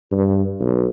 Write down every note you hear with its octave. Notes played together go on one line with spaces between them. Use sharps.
G2
B1